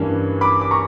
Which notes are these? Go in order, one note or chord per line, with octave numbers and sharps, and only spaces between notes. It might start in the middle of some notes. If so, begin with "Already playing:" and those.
Already playing: G2 E3 A#3 C#4
B5 D6
D6
A#5 C#6